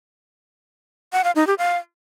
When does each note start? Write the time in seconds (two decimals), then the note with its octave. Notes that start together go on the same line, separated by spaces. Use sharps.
1.13 F#5
1.24 F5
1.36 D#4
1.47 G4
1.58 F5